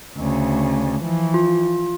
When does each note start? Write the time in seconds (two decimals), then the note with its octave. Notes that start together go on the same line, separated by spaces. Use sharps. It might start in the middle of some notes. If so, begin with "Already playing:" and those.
0.18 D2 C#3
1.02 E3 F3
1.34 F4